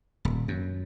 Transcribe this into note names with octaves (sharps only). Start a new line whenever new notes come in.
D#1
F#2